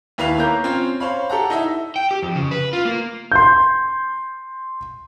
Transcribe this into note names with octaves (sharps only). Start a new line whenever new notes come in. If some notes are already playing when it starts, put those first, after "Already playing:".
D#2 E4 B4 F5 F7
A#3 C#5 A#5 G6
C4 C#4 F4 C#5 F5
C5 C#5 F5 B5
G4 A4 F#5 A#5
D#4 E4 E5
G5
G4
F2
C#3
B4
F4
A#3
C6 G6